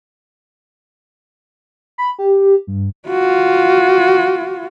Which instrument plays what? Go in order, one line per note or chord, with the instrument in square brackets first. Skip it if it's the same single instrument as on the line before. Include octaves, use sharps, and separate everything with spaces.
[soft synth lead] B5
G4
G2
[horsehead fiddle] F4 F#4